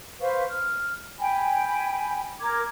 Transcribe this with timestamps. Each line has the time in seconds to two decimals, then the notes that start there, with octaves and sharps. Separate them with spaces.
0.20 B4 C5 F5 C#6
0.49 F6
1.20 G5 G#5 B5
2.40 A#4 D6 G#6